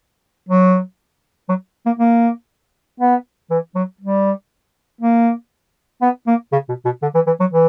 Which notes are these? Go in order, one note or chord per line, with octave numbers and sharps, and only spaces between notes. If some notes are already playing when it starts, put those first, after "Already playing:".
F#3
F#3
A#3
A#3
B3
E3
F#3
G3
A#3
B3
A#3
C#3
B2
B2
D3
E3
E3
F#3
E3